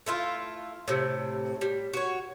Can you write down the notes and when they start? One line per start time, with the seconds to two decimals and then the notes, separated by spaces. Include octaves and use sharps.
0.06 A3 E4 F4
0.88 A2 C3
1.61 G3
1.93 F#4 C#5